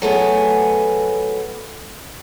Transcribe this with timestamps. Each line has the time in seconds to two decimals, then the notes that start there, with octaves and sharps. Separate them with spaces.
0.02 F#3 A3 B3 G#4